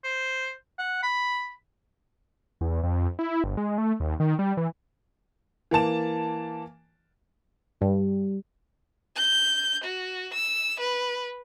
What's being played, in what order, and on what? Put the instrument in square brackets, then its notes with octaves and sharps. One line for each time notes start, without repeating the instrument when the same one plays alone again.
[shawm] C5
F#5
B5
[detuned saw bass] E2
F2
E4
G1
G#3
A3
D#2
D#3
G3
E3
[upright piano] E3 A#3 A5 E7
[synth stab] G2 [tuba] G3
[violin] G6
F#4
E6
B4